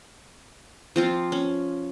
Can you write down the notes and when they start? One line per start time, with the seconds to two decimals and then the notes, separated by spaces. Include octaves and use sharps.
0.96 F3 C4 F4
1.32 C#4